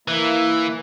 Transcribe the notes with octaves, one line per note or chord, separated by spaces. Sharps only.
E3 A#3 E4